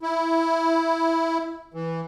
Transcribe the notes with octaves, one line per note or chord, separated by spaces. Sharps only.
E4
E3